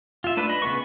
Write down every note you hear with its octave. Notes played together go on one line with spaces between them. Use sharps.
F4 E5
A3 D4 B4
D#5 B5
C#3 B3 B4 C#6